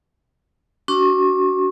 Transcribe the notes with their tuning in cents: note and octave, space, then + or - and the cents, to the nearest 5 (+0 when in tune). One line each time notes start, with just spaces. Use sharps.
D4 -35 F#4 +20 C#6 -40